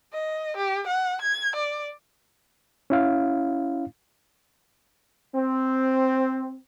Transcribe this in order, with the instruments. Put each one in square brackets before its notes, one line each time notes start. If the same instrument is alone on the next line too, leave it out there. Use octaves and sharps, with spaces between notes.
[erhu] D#5
G4
F#5
G#6
D5
[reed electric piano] C#4 E4 F5
[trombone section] C4